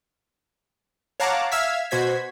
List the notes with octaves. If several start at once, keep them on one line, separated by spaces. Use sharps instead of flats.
C#5 F5 F#5 A5 A#5 D6
E5 F5 E6 F6 G#6 B6
B2 F#4 C5 G#6 B6